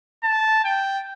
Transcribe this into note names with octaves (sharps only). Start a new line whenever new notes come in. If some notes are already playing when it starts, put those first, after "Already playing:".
A5
G5